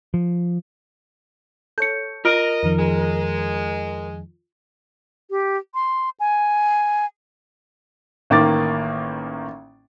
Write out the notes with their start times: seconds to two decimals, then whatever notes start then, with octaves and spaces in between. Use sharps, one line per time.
0.14 F3
1.78 A4 C#5 G6 C#7
2.25 F4 A#4 D#5 F6 D7
2.63 F2 D#3 F3
2.78 G#3
5.30 G4
5.74 C6
6.20 G#5
8.30 A1 D#3 A#3 D6 A6